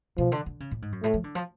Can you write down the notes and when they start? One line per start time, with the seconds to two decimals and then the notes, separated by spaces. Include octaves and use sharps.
0.17 B2 F3
0.32 D3
0.46 D3
0.60 C#3
0.71 A2
0.82 G#2
0.92 F#2
1.03 A2 A3
1.14 F3
1.24 D3
1.35 F3